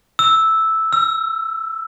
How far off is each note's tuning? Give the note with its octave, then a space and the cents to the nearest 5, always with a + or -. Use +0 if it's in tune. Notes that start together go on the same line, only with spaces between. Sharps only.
E6 -5
E6 +35